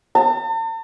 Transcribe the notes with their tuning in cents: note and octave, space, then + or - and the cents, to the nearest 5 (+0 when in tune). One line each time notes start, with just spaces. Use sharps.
A5 +45